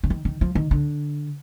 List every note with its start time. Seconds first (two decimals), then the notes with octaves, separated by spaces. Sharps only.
0.04 D3
0.10 D#3
0.25 D#3
0.41 F3
0.55 D#3
0.71 D3